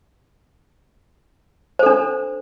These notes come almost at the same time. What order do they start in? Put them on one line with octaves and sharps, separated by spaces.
C5 A4 D4